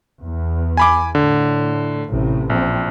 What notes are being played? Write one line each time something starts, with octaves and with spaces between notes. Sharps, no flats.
E2
G#5 B5 D6
A2 D3
A1 A2 C3
A#1 C4